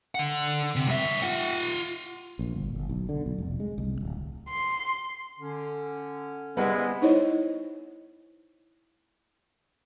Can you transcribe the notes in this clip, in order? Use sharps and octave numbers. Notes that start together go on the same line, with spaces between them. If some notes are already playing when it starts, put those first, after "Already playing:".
D3 F#5
C3
G2 E5
F4 F#5
A#1
G1
G1
B1
D3
B1
F1
G#3
C2
D1
C6
D3 C#4
G3 G#3 B3 C4 E4 B4 F#5
D#4 E4 C5 C#5 D#5